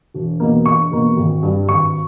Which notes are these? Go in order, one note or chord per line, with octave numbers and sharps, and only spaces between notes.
E1
E2 B2 A#3
E1 C#6
E2 B2 A#3
G#1
G2 G3
G#1 C#6